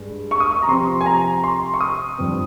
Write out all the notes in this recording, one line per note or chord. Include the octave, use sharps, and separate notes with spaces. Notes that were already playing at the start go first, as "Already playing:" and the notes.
Already playing: G2 G#3
C#6
D#6
C#6
A#5
C3 F3 C4 C6
G#5
A#5
C6
C#6
D#6
G2 F3 C4